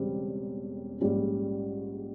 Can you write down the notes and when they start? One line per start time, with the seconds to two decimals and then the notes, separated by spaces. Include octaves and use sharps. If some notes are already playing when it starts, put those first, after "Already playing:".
Already playing: E1 E2 C#3 G3 C4
1.00 A#1 G#2 G3 C#4